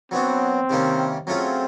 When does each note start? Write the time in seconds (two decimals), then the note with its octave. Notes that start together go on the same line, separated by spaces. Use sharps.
0.11 F#3 B3 C4 D4 F#4
0.70 C3 D#3 G3 A#3 C#4
1.27 F#3 A3 C4 C#4 F4 G#4